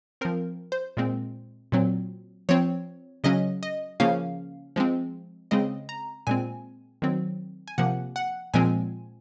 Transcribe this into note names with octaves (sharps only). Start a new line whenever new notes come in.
F3 C4 A#4
C5
A#2 G#3 C4
A#2 F#3 C4
F3 C4 C#5
C#3 F#3 C#4 D#5
D#5
C#3 F3 A#3 C#4 F5
F3 G#3 C4
C#3 G#3 C4 D#5
A#5
A#2 G#3 C4 G#5
D#3 F#3 C4
G#5
C3 F3 A#3 F#5
F#5
A#2 F3 G#3 C4 G#5